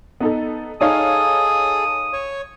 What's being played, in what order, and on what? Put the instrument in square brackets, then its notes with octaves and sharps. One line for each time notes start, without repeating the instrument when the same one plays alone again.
[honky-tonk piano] B3 D#4 A4
[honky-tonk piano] D#4 C#5 F5 [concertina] G#4 A4 [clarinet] D#6
[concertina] C#5